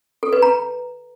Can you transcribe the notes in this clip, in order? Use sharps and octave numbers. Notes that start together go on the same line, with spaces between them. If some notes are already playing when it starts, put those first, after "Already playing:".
A4
B4
A#5